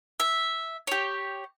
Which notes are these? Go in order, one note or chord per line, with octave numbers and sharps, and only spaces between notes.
E5
G4 C#5